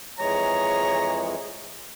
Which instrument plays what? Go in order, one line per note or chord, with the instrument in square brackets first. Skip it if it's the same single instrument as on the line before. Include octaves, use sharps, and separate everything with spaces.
[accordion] F2 E3 G#3 [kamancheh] G#4 C#5 [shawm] A#5